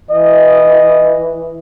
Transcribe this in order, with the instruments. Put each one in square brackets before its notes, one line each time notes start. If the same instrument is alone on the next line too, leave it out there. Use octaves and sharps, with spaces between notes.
[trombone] E3 [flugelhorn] D#5